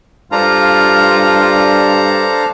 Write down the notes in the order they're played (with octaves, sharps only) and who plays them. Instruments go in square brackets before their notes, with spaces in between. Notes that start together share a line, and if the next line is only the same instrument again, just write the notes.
[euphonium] G2 [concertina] D4 A#5 [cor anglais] F4 [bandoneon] A4 C5 F5